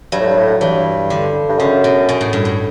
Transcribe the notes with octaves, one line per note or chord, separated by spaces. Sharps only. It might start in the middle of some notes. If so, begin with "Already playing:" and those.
G2 F#3
A2
G2
A2
G2 E3
D3
G2
F#2 C#3
B2
B2
A2
G2
A2